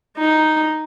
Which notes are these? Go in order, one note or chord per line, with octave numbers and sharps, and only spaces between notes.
D#4